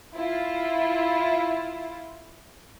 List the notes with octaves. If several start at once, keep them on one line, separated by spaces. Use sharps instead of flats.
E4 F4